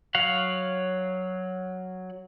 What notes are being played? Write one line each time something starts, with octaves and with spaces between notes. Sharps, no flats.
F#3 C#5 F5 F#5